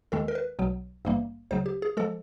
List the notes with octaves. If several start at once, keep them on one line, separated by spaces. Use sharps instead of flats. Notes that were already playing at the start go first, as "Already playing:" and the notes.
D#2 D#3 G#3 A4
A#4
B4
B1 B2 F#3
G#1 G2 E3 G3 A#3
D2 C#3 F#3 C5
G4
G#4
F3 G#3 A4